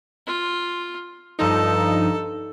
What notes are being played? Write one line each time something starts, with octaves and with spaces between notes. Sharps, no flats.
F4
G2 F3 D#4 A4